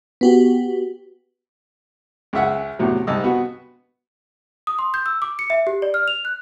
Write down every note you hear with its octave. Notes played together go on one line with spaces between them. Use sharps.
B3 F#4 G4
C#2 C#3 E5 F#5 G#5
E2 A2 C3 F#3
C2 G#2 D#5 A5 E6
B3 F#4
D#6
C6
G6
E6
D6
C#7
E5
G4
D5
F6
F7
F#6